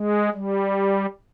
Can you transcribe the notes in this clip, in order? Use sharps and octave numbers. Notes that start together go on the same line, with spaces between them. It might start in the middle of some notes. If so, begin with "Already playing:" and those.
Already playing: G#3
G3